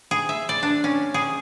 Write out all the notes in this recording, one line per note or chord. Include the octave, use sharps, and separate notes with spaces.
G#4
E5
D5
D4
C#4
G#4